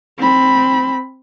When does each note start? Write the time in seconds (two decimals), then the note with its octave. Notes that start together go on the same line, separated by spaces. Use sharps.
0.17 C4 B5